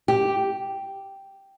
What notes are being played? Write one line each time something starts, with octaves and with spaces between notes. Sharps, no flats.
G4